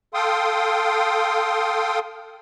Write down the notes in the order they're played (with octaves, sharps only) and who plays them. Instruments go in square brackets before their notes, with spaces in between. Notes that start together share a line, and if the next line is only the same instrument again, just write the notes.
[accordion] A4 F5 G5 C6 D#6